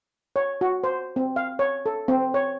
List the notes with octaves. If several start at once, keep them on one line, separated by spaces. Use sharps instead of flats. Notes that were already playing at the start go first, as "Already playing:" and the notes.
C#5
F#4
C5
C4
F5
C#5
A4
C4
C#5